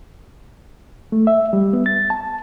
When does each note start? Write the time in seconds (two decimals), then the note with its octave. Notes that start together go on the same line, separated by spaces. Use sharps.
1.12 A3
1.27 E5
1.53 G3
1.73 B3
1.86 A6
2.10 A5